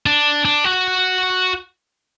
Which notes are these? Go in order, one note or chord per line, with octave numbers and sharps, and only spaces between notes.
D4
D4
F#4